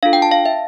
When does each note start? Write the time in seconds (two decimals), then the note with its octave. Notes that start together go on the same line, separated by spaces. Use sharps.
0.03 D4 F4 A4 F5
0.13 G5
0.22 A5
0.32 F5
0.46 E5